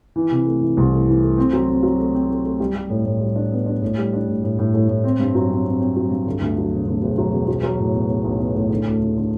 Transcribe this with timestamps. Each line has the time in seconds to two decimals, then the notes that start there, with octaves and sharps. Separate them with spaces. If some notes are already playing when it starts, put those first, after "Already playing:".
0.16 E3
0.31 C3
0.46 A3
0.61 E3
0.77 C2
0.92 A3
1.08 E3
1.23 A3
1.38 C4
1.53 F#3
1.68 C4
1.83 F#3
1.98 A3
2.15 C4
2.29 A3
2.45 A3
2.60 G3
2.75 G3
2.90 A2
3.05 A2
3.21 G3
3.36 D4
3.52 B3
3.66 D4
3.82 A2
3.98 G3
4.13 D4
4.28 A2
4.43 A2
4.59 A2
4.74 A2
4.88 A2
5.04 C4
5.19 G2
5.35 F#3
5.50 C4
5.65 C4
5.81 C4
5.96 F#3
6.11 G2
6.27 D3
6.41 D2
6.57 F#3
6.72 E1
6.88 D2
7.02 E1
7.18 F#3
7.33 E1
7.48 F#3
7.63 F#3
7.79 A2
7.94 B3
8.10 B3
8.24 B1
8.40 B3
8.55 A2
8.71 D3
8.86 D2
9.01 D3
9.17 D3